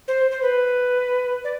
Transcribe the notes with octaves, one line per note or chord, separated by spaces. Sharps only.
C5
C5
B4
D5